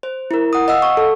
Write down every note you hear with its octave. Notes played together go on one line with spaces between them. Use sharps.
C5
E4 A#4
F#5 D#6
D#5 F5 F#5 E6
C#6
A4